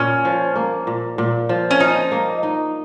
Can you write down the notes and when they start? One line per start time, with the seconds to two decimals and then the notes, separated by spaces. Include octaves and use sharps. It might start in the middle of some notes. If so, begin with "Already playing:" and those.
Already playing: A#2 C#4
0.25 F3
0.56 A#3
0.87 A#2
1.18 A#2
1.49 F3
1.71 C#4
1.80 F3 D#4
2.12 A#3
2.43 D#4